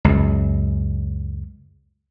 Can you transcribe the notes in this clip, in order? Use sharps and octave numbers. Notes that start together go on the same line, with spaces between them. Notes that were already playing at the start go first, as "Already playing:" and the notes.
C#2 F#2